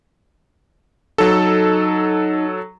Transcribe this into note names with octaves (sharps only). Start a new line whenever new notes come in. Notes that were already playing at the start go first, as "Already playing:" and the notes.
F#3 D#4 A4